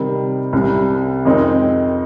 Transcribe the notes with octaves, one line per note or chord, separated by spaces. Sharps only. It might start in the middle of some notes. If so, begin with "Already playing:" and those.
Already playing: C3 D#3 G3
C2 C3 G3
F2 D#3 G#3 C4 D#4